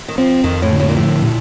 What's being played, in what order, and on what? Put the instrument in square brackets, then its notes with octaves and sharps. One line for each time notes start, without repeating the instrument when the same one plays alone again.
[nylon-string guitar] D#3
[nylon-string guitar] F3 [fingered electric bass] C4
[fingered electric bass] F2 [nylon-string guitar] D#3
[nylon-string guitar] A2
[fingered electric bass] D3
[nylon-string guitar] A2
A#2
[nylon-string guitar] A2 [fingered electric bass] F3
[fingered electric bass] A#2